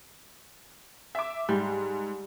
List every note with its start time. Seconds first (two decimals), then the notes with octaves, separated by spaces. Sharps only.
1.15 E5 D6
1.49 G#2 G3